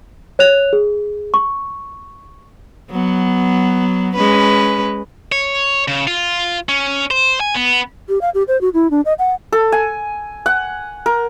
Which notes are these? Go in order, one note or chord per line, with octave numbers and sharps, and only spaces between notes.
C#5 F#6 F7
G#4
C#6
F#3 B3
G#3 C#4 B4
C#5
C#3
F4
C#4
C5
G#5
B3
G4
F5
G4
C5
F#4
E4
D4
D#5
F#5
A4
G#5
F#5
A#4